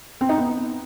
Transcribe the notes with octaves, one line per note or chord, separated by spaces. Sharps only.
C4
D#4
B3